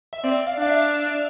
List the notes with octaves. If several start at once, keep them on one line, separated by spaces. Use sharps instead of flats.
E5
C4 D5
F5
D4 F5
E5